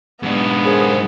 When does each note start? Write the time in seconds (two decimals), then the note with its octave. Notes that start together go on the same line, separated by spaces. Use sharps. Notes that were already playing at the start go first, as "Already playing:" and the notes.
0.23 G#2 B3 D4
0.65 G#4 A#4 C5